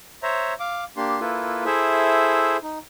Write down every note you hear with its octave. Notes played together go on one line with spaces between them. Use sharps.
C5 C#5 E5 A#5
F5 D6
A#3 D4 G4 C6
A#3 E4 F4 A4 B4
E4 G#4 A4 C5 E5
D#4